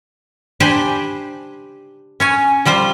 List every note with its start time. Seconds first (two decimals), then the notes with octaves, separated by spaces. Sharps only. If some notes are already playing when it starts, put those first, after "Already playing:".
0.60 D4 G4 C5 G#5 B5
2.20 C#4 C#5 G#5
2.65 F3 G3 F4 C5